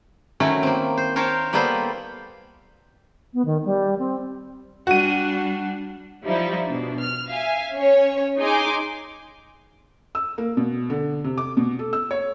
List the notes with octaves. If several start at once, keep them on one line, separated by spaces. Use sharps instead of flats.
D#3 F#3 A3 C#4 E4
A#3 C4
C5
A#4 C5 C#5 F5 G5 A5
G3 A#3 B3 A4 B4 C5
B3
D#3
G3
C4
G3 D4 F#4 D#7
F3 G3 D#4 E4
B2 D4
F6
E5 F5 G#5
C#4 C#5
D#4 G#4 G#5 C6 D6
E6
A#3
B2
D3
C3
D6
B2
A4
E6
C#5